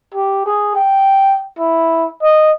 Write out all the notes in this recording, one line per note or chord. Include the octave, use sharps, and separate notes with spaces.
G4
G#4
G5
E4
D#5